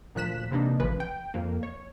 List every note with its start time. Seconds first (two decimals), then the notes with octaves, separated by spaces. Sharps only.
0.15 D2 A#2 F3 F#6 B6 E7
0.51 C3 E3 A#3 D4 D#4
0.79 A1 C#3 F3 B4
1.00 G5
1.34 F2 A#3
1.63 C#5